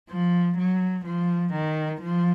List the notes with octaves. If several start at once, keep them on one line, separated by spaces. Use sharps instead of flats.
F3
F#3
F3
D#3
F3